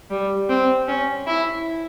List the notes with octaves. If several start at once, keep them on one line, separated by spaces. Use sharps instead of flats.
G3
C4
C#4
E4